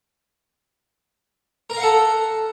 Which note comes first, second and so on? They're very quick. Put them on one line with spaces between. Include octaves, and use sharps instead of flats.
A#4 A#5 F5 F#5 A4